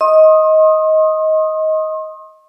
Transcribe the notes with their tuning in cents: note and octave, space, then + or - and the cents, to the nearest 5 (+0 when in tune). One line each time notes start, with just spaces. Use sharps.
D#5 +15 C6 +40 D#6 +0